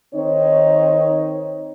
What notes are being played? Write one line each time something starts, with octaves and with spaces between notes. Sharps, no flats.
D#3 C4 D#4 C#5